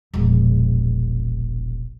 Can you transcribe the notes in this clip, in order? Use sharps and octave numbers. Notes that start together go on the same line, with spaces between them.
E1 A#1